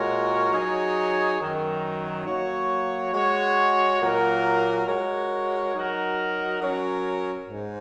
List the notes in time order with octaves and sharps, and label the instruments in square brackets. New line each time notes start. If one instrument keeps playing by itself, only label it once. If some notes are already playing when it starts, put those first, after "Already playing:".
Already playing: [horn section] A#2 G#3 F#4 A#4 C#5
F#3 D#4 G#4 C#5
F#2 D#3 F#3
F#3 A#3 F#4 C#5
G#3 F#4 C#5
A#2 F#3 A#3 F#4 A#4
G#3 F#4 A#4 C#5
F#3 D#4 F#4 A#4
F#3 C#4 A#4 C#5
G#2